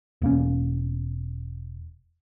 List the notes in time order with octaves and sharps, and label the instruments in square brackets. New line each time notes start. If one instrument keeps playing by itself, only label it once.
[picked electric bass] E1 A#3 C#4